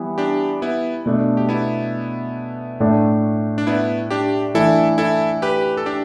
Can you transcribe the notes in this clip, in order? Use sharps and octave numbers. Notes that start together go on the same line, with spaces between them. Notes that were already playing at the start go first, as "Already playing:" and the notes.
Already playing: E3 G3 B3
D4 G4
B3 E4
B2 A3 D4
G4
B3 E4
A2 A3 D4
D4
B3 E4
D4 G4
E3 A3 D4 E4 A4
E4 A4
G4 B4
A4
D4 G4